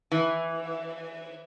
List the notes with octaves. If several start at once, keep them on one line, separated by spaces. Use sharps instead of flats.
E3